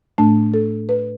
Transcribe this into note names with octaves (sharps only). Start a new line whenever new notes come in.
A2 A3 D4 A5
A4
B4